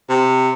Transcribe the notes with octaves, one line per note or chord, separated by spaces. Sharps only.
C3